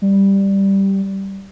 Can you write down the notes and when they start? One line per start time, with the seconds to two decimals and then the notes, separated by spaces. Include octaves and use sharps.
0.02 G3